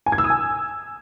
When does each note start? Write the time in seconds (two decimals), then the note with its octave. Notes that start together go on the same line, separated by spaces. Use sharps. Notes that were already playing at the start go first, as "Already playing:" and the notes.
0.06 G#5
0.12 G#6
0.18 E6
0.24 D#6
0.30 G#5